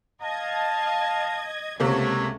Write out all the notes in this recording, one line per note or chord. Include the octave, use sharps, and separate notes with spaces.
D#5 F5 A5 G#6
C#2 C3 A3 A#3 F#4 C#5